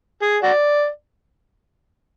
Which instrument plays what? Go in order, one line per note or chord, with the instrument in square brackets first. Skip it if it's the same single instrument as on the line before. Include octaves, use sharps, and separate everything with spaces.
[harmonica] G#4
F#4 D5